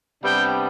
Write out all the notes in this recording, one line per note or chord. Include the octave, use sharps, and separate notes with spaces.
C3 G3 B3 D4 G5